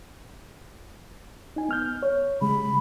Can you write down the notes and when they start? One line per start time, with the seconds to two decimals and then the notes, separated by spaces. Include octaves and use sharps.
1.56 D#4 G#5
1.69 B3 F6 G6
2.03 C#5
2.41 C#3 G3 G#3 B5